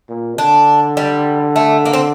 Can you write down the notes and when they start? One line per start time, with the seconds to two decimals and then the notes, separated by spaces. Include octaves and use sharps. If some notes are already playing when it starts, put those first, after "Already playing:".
0.09 A#2
0.38 D3 D4
0.97 G3
1.56 A3
1.86 A#3
1.93 C4